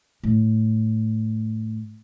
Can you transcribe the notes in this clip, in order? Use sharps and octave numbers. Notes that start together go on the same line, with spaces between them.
A2